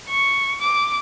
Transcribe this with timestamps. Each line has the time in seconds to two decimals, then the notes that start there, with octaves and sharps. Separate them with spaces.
0.10 C#6
0.61 D6